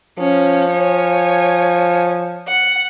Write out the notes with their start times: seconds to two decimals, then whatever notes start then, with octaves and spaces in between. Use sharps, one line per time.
0.19 F3 C#4
0.70 C#5 G#5
2.47 F#5